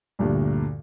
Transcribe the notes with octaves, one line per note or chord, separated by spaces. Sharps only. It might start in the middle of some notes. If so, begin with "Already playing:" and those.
D2 G2 A#2